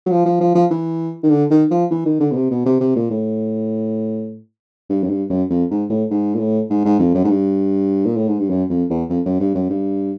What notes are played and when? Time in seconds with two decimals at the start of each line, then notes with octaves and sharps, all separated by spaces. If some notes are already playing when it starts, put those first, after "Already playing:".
0.06 F#3
0.11 F3
0.26 F3
0.41 F3
0.55 F3
0.71 E3
1.23 D#3
1.31 D3
1.51 D#3
1.71 F3
1.91 E3
2.06 D#3
2.20 D3
2.31 B2
2.36 C3
2.51 B2
2.66 C3
2.81 C3
2.96 A#2
3.11 A2
4.90 G2
5.04 F#2
5.10 G2
5.30 F#2
5.50 F2
5.71 G#2
5.90 A2
6.11 G#2
6.35 A#2
6.40 A2
6.70 G#2
6.85 G#2
6.99 F2
7.15 F#2
7.24 G#2
7.30 G2
8.06 A#2
8.17 A2
8.28 G#2
8.39 G2
8.50 F#2
8.70 F2
8.90 E2
9.10 F2
9.25 F#2
9.40 G2
9.55 F#2
9.70 G2